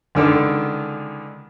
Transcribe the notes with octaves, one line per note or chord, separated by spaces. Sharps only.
C#2 D3 D#3 A4